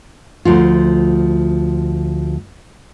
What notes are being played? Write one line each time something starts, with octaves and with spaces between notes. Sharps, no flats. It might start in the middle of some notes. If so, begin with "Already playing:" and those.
D2 F3 F4